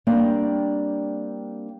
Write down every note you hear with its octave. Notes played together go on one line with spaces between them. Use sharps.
G3 A#3 C4 D4